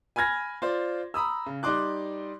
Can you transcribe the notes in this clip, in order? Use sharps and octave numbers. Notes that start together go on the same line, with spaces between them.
G#5 B5 F6 G#6 A#6
F4 C5 D5
A#5 B5 D#6 E6
C#3
G3 D#4 D5 C6 D6 F#6